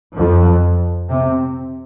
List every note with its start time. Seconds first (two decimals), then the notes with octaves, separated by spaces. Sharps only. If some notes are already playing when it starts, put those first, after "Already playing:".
0.17 F2 F3
1.09 C3 C4